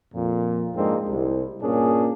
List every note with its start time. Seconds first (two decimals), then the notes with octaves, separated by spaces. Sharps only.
0.14 F2 A#2
0.75 F2 G#2 G#3 A#3 C4 D4
1.07 C2
1.62 G2 A#2 A#3 C#4 D4 G#4